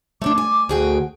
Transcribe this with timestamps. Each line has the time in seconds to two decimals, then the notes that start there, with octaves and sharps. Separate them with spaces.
0.22 A3 C4 D4 D6
0.38 G#5
0.69 D2 F#4 G#4 G5